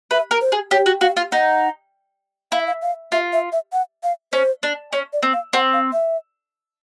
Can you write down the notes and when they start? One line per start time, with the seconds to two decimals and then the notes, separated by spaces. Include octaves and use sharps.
0.11 B4 E5
0.31 A#4
0.41 C5
0.52 G#4
0.71 G4 C#5
0.86 F#4
1.01 F#4 F5
1.17 F4
1.32 D#4 F#5
2.52 E4 F5
2.60 E5
2.67 F5
2.82 F5
3.12 F4 E5
3.33 E5
3.52 E5
3.73 F#5
4.03 F5
4.33 C#4 C5
4.63 D4
4.93 C#4 C#5
5.13 D5
5.23 C4
5.33 F5
5.53 C4 F#5
5.73 F5
5.93 E5